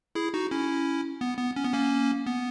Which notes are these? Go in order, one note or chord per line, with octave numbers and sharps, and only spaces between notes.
E4 G#4
D#4 F#4
C#4 E4
B3
B3
C#4
B3
A#3 C#4
B3